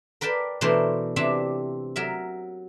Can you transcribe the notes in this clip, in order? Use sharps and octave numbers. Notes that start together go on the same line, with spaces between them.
A#4 B4 D5 G5 A5
B2 E3 A3 D4 A#4 C5
C3 E3 C4 D4 E5
F#3 A#4 E5